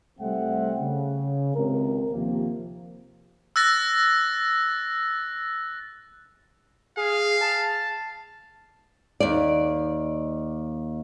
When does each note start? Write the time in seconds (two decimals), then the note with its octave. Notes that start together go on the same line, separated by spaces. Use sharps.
0.19 C2 G3 A3 C4 E5 F#5
0.80 C#3
1.55 G#1 C#2 C3 A#4
2.12 D#2 C3 F3 A#3
3.56 E6 F#6 A6 A#6
6.97 G#4 F5
7.41 A5
9.20 D#2 D5